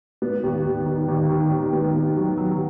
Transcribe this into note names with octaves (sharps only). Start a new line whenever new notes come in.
B3
D#2
D#2
D#3
D#2
D#3
D#2
B3
D#2
F#3
F#3